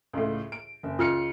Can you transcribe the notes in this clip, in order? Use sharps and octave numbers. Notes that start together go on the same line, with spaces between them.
C#2 A2
D7
F#1
C#2 F4 F6 C#7